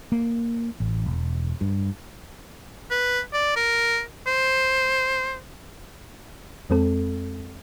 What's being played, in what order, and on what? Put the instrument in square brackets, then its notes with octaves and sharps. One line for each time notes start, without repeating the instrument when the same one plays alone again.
[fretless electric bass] A#3
A1
E1
G2
[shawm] B4
D5
A#4
C5
[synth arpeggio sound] F2 G#3 C4 A4